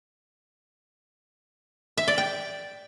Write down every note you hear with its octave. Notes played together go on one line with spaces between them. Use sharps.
E5
D5
G5